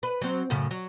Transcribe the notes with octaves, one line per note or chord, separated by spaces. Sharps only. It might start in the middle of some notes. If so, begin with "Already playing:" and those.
B4
F#3 C4
F#2 A2 C#3
F#3